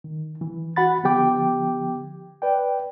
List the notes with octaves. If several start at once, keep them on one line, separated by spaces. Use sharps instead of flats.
D#3
E3
F#4 F#5 B5 A6
D3 F3 B3 G4 G5 D6
B4 D5 G5